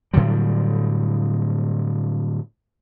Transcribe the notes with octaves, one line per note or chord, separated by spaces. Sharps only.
A2 D3 F#3 G3